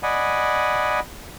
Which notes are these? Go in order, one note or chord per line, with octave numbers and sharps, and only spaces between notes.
D5 D#5 F#5 G#5 B5